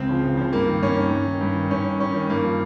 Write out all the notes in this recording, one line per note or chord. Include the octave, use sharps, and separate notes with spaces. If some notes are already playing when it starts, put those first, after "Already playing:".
Already playing: C#2 C4
C#3 F3
C#2
C#3 F3
G2 A#3
D#3
G2 C#4
D#3
G2
D#3
G2
D#3
G2 C#4
D#3
G2 C#4
D#3
G2 A#3
F3